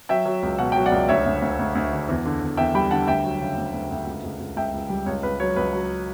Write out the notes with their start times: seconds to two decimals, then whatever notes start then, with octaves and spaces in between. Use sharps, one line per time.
0.09 F#3 E5 G5
0.25 F#3
0.43 C#2
0.59 B2 F#5
0.72 F#3 G5
0.86 D5 F#5
0.92 C#2
1.09 D2 C#5 E5
1.26 D2
1.42 D2
1.59 D2
1.75 D2
1.92 D3
2.09 E2
2.25 D3
2.41 E2
2.57 E2 E5 G5
2.74 G3 G5 B5
2.91 D3 F#5 A5
3.07 D2 E5 G5
3.24 F#3
3.41 C#3
3.57 D2
3.74 D2
3.91 D2
4.07 C#2
4.24 C#2
4.40 C#2
4.56 C#2 E5 G5
4.74 C#2
4.89 G3
5.06 C#2 C#5
5.23 C#2 B4
5.40 F#3 C#5
5.56 C#2 B4
5.73 F#3